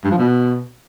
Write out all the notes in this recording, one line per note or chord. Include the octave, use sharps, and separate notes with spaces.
G2
F3
B2